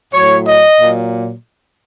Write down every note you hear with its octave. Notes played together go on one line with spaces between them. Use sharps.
A2 F#3 C#5
D#5
A#2 F#3